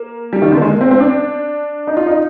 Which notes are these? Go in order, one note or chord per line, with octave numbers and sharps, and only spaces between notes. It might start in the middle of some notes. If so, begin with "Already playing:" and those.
Already playing: A#3
G3
D#3
D3 A#3
G#3
C4
C4
D4
D#4
F4
D#4